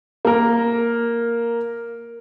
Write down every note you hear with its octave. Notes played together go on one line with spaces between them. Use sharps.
A#3 A#4